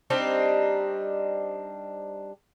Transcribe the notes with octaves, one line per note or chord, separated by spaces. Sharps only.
G3 C4 D4 D#4